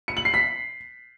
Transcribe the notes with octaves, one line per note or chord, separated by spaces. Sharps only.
C#7
F#7
C7
B6